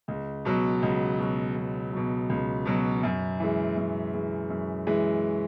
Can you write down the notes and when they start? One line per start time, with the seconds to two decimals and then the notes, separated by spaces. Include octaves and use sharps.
0.08 C#2
0.45 B2 F#3
0.82 C#2
1.19 B2 F#3
1.56 C#2
1.93 B2 F#3
2.29 C#2
2.65 B2 F#3
3.03 F#2
3.40 E3 G#3
3.76 F#2
4.14 E3 G#3
4.50 F#2
4.87 E3 G#3